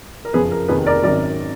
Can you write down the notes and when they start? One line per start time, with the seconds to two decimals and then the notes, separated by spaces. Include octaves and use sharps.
0.25 A#4
0.33 F#1 F2 F3 G#4 B4
0.51 A#4
0.68 F1 D#2 D#3 G#4 B4
0.86 A#4 D5
1.03 G#1 F#2 D#3 F#3 A#4 D5